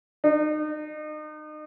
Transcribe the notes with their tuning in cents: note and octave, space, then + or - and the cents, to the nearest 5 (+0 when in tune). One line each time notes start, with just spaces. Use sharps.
D#4 -35